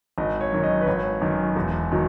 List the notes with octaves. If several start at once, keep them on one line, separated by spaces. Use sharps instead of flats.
G#1 D#5
C#5
F#2 D#3
D#5
B4
G#1 C#5
F#2 D#3
E1
D#3 F#3